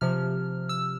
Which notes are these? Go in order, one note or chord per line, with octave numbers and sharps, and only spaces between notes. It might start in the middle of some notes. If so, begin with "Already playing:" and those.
C3 F3 F6
E6